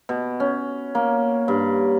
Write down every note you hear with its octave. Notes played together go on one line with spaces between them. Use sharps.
B2
C#4
A#3
G2